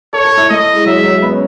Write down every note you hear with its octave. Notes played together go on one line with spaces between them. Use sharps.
A4 C#5
A4
E4
A3 D#5
G#3
F#3 E5
G#3
F#3
G#3
B3
C#4